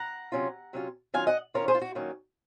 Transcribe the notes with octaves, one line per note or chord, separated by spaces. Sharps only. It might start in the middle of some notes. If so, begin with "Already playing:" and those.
Already playing: F#5 A#5
C3 F#3 C#4 F4
C3 F#3 C#4 F4
D#3 F#3 C#4 F4 F5 G#5
D#5 F#5
D#3 F#3 C#4 F4 A#4 C#5
G#4 C5
F4
F#4
D#3 F#3 A#3 C#4